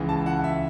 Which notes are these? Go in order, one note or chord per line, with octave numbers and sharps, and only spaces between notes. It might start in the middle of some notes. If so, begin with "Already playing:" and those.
Already playing: C#2 C#3 E3
A5
F#5
E5